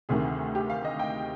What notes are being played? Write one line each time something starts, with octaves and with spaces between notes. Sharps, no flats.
D2 C3 D#3 G#4
G4
F5
D#5
G5